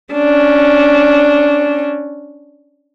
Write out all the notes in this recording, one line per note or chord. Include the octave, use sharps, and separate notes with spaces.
C#4 D4